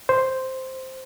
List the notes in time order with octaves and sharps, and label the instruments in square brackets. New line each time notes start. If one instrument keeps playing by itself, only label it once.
[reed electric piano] C5